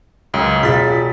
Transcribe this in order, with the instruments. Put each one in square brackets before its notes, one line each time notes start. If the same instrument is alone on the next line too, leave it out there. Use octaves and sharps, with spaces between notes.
[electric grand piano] C#2 F#2
[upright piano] E1 F4 [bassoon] G#4 [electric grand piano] A6 B6